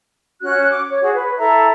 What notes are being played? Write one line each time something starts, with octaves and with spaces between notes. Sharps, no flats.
C#4 F#4 F#6
D6
C#5
F#4 G#4
B4
E4 A4 E5 A#5